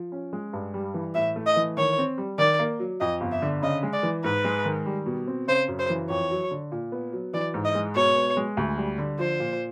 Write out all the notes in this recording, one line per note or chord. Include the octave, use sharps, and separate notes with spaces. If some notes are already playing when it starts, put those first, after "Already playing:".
Already playing: F3
C#4
G#3
G2
G3
E3
A2 E5
A3
D#5
E3
D#3 C#5
C4
G3
D#3 D5
A#3
F#3
F2 D#5
G1
E5
D3
C#3 D#5
G#3
D5
E3
G#2 B4
G#3
D#3
G3
B2
C4
C#3 C5
F#2
C5
E3
F2 C#5
F#3
D3
A#2
B3
F#3
E3 D5
G#2
D#5
G#3
B2 C#5
B3
G#3
D2
G3
D3
F3 C5
A#2